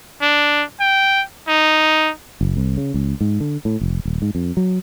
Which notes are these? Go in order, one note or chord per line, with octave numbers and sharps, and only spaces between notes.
D4
G5
D#4
F#1
C2
C#3
C#2
G#2
D3
A2
F1
D#1
G#2
F2
F#3